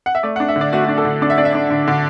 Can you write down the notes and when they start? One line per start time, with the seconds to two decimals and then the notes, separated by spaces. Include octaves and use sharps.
0.06 F#5
0.15 E5
0.23 A3 D5
0.36 F#5
0.40 D4
0.49 E5
0.56 D3
0.61 D5
0.73 A3 F#4
0.85 D4 F#4
0.98 A4
1.05 D3
1.22 D4 D5
1.30 E5
1.37 D4 D5
1.45 E5
1.53 D4 D5
1.70 D3
1.88 D3